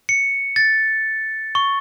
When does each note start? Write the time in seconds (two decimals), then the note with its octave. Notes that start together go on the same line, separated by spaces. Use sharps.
0.09 C#7
0.56 A6
1.55 C#6